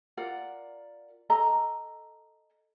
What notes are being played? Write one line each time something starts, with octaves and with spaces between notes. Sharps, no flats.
F4 A#4 D5 F#5
A4 D#5 G#5 A#5